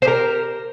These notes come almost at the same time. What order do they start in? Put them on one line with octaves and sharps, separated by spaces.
C5 G4 A#4